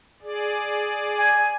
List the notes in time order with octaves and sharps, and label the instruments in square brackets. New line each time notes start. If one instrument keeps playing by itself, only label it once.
[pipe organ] G#4 D5
[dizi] G#5